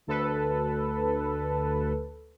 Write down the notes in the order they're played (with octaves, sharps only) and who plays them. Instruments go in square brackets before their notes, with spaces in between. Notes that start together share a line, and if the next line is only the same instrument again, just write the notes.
[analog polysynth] D2 A4 B4